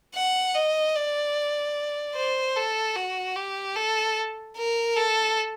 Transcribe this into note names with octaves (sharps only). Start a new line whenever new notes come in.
F#5
D#5
D5
C5
A4
F#4
G4
A4
A#4
A4